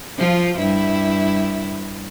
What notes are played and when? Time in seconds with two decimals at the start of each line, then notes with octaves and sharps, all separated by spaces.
0.18 F3 F4
0.59 G2 E4